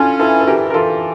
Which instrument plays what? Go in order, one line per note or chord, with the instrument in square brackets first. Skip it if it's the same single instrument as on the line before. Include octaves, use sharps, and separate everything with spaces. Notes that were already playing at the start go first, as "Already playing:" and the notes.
Already playing: [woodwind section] C#4 [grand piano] D4 E4 F4 A4
[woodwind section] E3 [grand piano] F4 A4
[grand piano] A4
[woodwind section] E3 [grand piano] G4 A#4
[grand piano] A#4
[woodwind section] E3 [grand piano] F4 A4